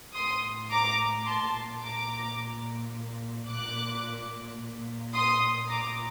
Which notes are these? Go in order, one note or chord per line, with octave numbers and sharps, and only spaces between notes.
A2 C6 D#6
A#5 D6
A#2 A5 C6
A#5 D6
A#2
A#2 D6 F#6
A#2
C6 D#6
A#2 A#5 D6